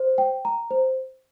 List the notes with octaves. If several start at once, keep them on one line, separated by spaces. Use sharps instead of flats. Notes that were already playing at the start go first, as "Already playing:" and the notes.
Already playing: C5
G5
A#5
C5